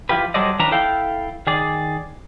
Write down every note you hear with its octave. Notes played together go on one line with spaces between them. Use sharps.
F3 E4 F4 G4 B4
F#3 G3 A4 C5 D5 D#5
D#3 F3 C#4 D4 B4 A#5
E4 A4 F5 G5
D#3 G#4 D5